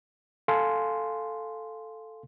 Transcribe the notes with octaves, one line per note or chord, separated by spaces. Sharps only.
A4 F5 G#5 C6